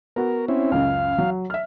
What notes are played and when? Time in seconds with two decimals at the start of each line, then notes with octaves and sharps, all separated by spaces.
0.16 B3 F#4 A#4
0.48 C4 C#4 E4
0.72 C#2 F#2 C#3 F5
1.18 F#3
1.50 E5 F6